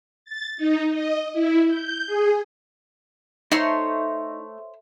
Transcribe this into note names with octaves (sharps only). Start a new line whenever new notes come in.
A6
D#4
D#5
E4
G6
G#4
A3 D#4 C5 C#5 C6